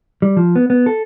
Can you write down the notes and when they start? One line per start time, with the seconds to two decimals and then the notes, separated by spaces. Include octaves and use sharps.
0.22 G3
0.37 F3
0.56 B3
0.70 B3
0.86 A4